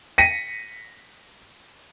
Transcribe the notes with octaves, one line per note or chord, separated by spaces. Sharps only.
A#6 B6 C#7 D#7